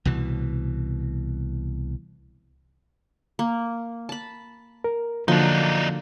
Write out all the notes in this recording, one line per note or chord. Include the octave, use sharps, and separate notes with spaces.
C2 B2 E3
A#3
A5 B5
A#4
D3 F3 F#3 A#3 D4 D#4